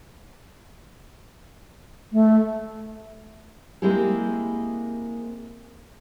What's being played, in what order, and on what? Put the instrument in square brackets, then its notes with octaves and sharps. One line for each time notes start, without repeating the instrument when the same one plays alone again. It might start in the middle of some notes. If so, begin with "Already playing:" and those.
[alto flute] A3
[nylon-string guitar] G#3 A#3 C4 E4 G4 G#4